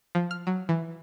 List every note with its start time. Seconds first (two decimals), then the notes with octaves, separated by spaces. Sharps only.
0.15 F3
0.31 F6
0.47 F#3
0.69 E3